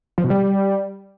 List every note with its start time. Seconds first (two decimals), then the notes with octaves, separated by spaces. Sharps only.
0.18 F3
0.24 B2
0.30 G3